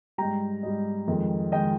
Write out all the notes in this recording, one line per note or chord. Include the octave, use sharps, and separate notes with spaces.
G#2 G3 G5 A#5
G#2 G3 D#5
F2 D#3 G#3
D#3 G#3 D#5 G5